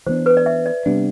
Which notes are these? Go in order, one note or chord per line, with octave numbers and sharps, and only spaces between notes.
E3 G3 B3 D4 C5
B4
D5
E5
D5
C3 G3 B3 D4